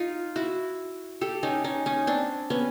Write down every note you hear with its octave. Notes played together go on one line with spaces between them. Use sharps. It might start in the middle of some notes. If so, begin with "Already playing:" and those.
Already playing: D#4 F4
E4 F#4
G4 A4
C#4 D#4
C#4 D#4
C#4 D#4
C4 D4
B3 C#4